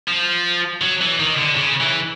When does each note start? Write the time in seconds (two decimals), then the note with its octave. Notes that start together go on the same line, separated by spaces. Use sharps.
0.08 F3
0.82 F#3
1.01 E3
1.20 D#3
1.37 D3
1.56 C#3
1.81 E3